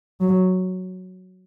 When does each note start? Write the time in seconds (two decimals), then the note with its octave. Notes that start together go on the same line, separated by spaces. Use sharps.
0.21 F#3